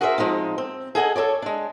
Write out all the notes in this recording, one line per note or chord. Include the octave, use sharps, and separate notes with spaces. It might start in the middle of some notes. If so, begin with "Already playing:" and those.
F#4 G#4 A#4 C5 D#5 E5
F3 G#3 C4 D#4
C4
G#4 A4 D#5 F#5 G#5
A4 A#4 C#5 D5
G#3 D4